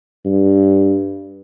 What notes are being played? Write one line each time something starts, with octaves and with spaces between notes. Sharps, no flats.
G2